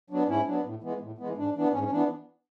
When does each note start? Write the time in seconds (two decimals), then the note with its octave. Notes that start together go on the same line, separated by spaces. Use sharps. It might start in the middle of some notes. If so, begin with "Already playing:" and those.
0.10 F#3 B3 D4
0.28 G#2 C#4 E4
0.46 F#3 B3 D4
0.65 A2
0.82 E3 G#3 B3
1.01 A2
1.18 E3 G#3 B3
1.37 G#2 D4
1.55 E3 B3 D4
1.73 G#2 C#4
1.83 C#4
1.91 E3 B3 D4